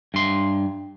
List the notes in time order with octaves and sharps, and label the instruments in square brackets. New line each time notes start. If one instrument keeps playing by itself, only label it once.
[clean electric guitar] G2 C6